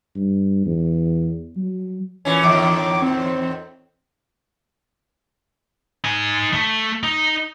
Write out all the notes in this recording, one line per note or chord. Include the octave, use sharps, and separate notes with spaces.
G2
E2
F#3
A#2 E3 C#4
E2 A2 D#3 D6
C4
D#4 G#5
A3
D#4